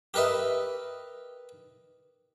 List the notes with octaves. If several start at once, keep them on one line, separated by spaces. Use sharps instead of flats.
G4 A#4 B4 D#5 E5